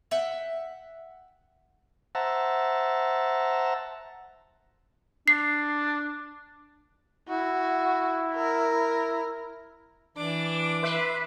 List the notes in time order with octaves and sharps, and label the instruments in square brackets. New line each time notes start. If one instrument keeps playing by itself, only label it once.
[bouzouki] E5 F#5 G5
[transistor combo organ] C5 E5 F#5 A5 A#5
[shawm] D4 [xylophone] C7
[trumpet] E4 [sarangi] F#4
[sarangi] A#4
[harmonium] E3 [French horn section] D4 [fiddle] D6
[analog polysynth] B4 E5 C6